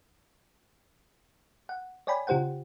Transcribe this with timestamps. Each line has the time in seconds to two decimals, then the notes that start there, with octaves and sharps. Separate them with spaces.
1.69 F#5
2.07 C#5 D5 G5 G#5 B5
2.27 C#3 F4 G4 C5 F#5 G5